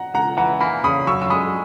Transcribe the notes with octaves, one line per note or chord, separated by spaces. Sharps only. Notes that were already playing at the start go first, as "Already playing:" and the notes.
Already playing: F#5 A#5
C#2 F#5 A#5
E3 F#5 A#5
A#3 G#5 B5
C#3 B5 D#6
F#2 C#6 E6
E6
G#3 B5 D#6